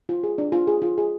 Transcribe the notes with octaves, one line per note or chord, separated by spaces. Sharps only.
F4
G#4
D4
F4
G#4
F4
G#4